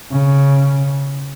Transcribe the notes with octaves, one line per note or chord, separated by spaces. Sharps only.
C#3